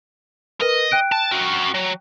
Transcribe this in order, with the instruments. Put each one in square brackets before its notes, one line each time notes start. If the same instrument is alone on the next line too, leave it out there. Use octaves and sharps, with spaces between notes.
[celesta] A#4 B4 [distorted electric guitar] D#5
[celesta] G5 F#6 D7
[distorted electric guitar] A5
F#4 A#4
F#3